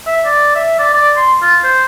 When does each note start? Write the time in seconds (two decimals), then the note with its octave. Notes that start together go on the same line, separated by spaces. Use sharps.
0.06 E5
0.25 D5
0.55 E5
0.79 D5
0.93 D5
1.17 C6
1.42 F4
1.63 C5